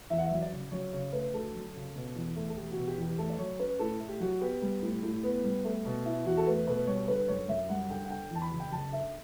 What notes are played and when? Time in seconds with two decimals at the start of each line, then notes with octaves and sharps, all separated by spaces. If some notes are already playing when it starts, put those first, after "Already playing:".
0.10 E2 E5
0.17 F#5
0.25 E5
0.31 F#3
0.42 D5
0.51 C#3
0.72 F#3 C#5
0.93 C#3 C#5
1.12 A3 B4
1.33 D2 A4
1.54 F#3
1.75 C#3
1.96 B2
2.16 E2
2.36 A3
2.49 A4
2.56 E1 G4
2.71 F#4
2.77 B2
2.87 G4
2.98 E2 G4
3.18 A3 A4
3.30 D5
3.38 F#3 C#5
3.59 C#4 B4
3.79 A2 A4
3.99 A3
4.09 G4
4.20 F#3 F#4
4.41 B3 G4
4.62 G3
4.82 A2
5.03 A2
5.23 B3
5.44 G3
5.64 A3
5.85 B2
6.05 E4
6.25 E2 F#4
6.37 A4
6.47 A3 B4
6.67 B2 B4
6.87 G3 C#5
7.08 D3 B4
7.28 F#2 C#5
7.48 F#2 E5
7.69 G3 F#5
7.89 D3 G5
8.05 F#5
8.10 D3 G5
8.31 E2 A5
8.42 B5
8.51 F#1
8.59 G5
8.72 F#1 A5
8.92 D3 E5